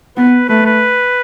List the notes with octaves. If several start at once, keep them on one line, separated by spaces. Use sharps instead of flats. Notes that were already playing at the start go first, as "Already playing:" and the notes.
B3 B4
A3 B4
B4